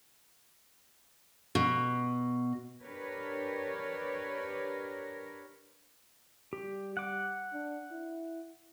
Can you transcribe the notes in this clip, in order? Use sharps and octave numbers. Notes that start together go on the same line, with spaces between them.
B2
D4 G4 A#4 B4 C#5
G3 G4
F#5 D6
D4
E4